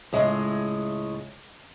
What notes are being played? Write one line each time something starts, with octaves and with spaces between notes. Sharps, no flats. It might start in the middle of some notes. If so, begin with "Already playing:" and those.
C#2 A2 G#3 E5